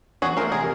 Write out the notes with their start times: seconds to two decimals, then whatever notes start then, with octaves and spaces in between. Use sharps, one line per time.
0.22 E2 F#4 G#4
0.37 A3 A#4 C5
0.52 C3 G#4 A#4